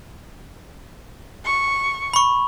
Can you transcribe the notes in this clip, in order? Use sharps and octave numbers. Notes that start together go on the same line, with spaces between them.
C#6
B5 C#6